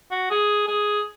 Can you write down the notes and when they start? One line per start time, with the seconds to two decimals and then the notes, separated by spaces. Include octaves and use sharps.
0.11 F#4
0.31 G#4
0.68 G#4